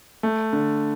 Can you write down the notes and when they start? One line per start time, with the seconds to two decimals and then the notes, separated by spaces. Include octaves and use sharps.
0.23 A3
0.53 D3